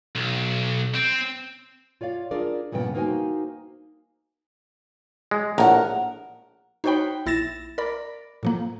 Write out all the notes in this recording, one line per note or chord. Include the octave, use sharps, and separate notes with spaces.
B1
C4
F4 C#5 D5 F5
D4 F4 G#4 A#4 D5
G2 A#2 C#3 F3 B3 G5
A#3 D#4 F#4 C5 G5 G#5
G#3
A#1 A2 A#4 F#5
D#4 F#4 C5 C#5 G5 B5
A#1 E4 A6 A#6 E7
A#4 D5 B5
A2 F3 A#3